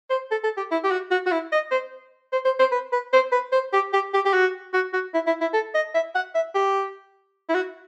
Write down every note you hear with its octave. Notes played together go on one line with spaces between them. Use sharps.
C5
A4
A4
G4
E4
G4
F#4
F#4
F#4
E4
D#5
C5
C5
C5
C5
B4
B4
C5
B4
C5
G4
G4
G4
G4
F#4
F#4
F#4
E4
E4
E4
A4
D#5
E5
F#5
E5
G4
E4
F#4